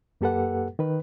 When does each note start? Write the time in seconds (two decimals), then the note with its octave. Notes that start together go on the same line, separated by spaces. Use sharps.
0.21 F#2 A#3 G4 A4 B4 F#5
0.79 D#3 B4